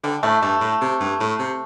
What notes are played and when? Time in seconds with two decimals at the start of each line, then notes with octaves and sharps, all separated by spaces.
0.04 D3 G3
0.23 A2 A3
0.42 G2 A3
0.61 A2
0.81 C3
1.00 G2
1.20 A2
1.39 C3